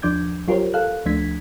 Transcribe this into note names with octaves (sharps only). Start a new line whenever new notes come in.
D#2 F3 D4 D6 G6 G#6
F#3 F4 G4 A#4 C5 C#5
A4 F5 F#6
D2 F3 A3 D4 G#6 B6